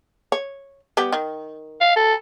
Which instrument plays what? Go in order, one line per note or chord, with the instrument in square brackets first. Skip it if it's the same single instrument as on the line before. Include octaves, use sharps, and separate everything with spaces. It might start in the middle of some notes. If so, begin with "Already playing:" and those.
[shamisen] C#5
G3 B3 G4
D#3
[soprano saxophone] F5
A4